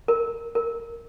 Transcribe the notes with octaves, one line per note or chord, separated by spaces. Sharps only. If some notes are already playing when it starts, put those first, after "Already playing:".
A#4
A#4